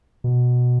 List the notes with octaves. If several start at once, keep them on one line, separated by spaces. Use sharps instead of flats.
B2